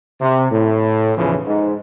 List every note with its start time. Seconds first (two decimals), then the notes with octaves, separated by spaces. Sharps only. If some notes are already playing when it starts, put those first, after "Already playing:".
0.21 C3
0.52 A2
1.16 B1 E2 C#3 E3 F3
1.46 G#2